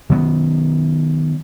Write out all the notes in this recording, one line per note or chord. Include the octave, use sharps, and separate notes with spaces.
D#3 F#3 B3